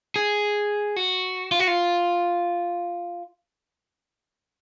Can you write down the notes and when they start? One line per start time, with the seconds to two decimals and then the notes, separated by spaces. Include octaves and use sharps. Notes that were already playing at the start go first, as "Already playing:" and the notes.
0.16 G#4
0.96 F#4
1.52 F4
1.60 F#4
1.68 F4